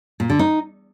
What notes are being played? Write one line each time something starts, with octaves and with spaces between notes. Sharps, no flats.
A#2
D3
D#4